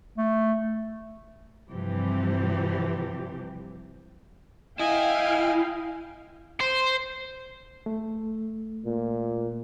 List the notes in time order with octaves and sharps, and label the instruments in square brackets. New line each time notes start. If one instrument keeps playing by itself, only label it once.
[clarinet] A3
[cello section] G2 C3 E3 F3 G4
[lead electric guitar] E4 [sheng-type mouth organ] D#5 [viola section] F5 G5 [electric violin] G#5
[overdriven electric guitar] C5
[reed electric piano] A3
[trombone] A#2